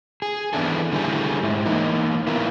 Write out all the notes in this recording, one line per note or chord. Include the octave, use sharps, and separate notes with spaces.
G#4
E3 B3 D4 E4 A4
D3 G3 E4 G4 G#4
G#2 G#3 E4
E3 A#3 D#4
B3 E4 F4 A#4